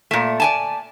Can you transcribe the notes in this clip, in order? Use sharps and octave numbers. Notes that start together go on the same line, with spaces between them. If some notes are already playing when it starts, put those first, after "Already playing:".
A#2 A3
D5 G#5 A5